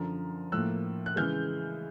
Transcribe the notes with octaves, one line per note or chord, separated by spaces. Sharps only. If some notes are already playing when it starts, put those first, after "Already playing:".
Already playing: F#2 D3 F3 A#5
A2 F3 A#3 E6 F#6
F#6
C#3 E3 G#3 F6 G6